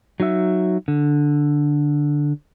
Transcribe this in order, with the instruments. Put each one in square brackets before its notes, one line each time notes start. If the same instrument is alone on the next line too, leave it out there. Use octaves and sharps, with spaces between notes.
[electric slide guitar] F#3 D#4 F#4 E5
D3